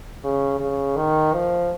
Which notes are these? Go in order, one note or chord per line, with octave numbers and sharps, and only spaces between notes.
C#3
C#3
D#3
F3